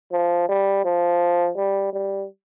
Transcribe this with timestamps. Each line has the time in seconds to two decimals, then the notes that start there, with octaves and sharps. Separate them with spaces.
0.12 F3
0.49 G3
0.85 F3
1.56 G3
1.93 G3